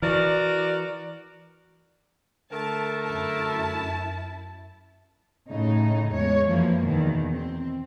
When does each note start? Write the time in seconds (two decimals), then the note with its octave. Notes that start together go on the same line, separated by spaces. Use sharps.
0.02 E3 F#4 A#4 D5
2.52 D3 A3 A#4 A5
3.04 F#2 E4 A5
5.49 A2 C#3 D#4
6.13 E2 G#3 C#5
6.48 F#2 E3 F3 A#3
6.87 E2 B2 D#3
7.33 C4